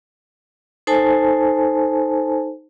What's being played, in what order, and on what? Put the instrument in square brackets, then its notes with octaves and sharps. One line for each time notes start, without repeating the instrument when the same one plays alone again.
[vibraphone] D#4 A4 C5 G#5 A5